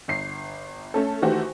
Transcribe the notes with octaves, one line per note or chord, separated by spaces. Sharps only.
G1 C7
A3 C#4 A4
D#3 E3 A3 F#4 G4 C5